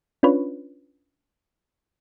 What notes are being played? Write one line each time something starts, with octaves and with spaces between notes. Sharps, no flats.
C#4 D4 F4 B4 C#5